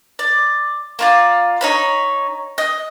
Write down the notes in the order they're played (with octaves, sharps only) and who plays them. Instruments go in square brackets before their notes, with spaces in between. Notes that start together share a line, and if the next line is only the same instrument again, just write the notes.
[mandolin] D5
A#3 F4 D5
D#4 C#5 B5
D#5